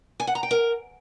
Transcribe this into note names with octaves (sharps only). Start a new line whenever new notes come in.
G#5
F#5
A#5
G5
A#4